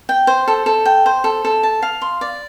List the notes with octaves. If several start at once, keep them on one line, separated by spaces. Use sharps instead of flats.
G5
C5
A4
A4
G5
C5
A4
A4
A5
F5
C6
D5